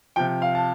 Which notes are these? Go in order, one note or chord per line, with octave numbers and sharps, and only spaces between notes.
C3 F3 G5
F5
A5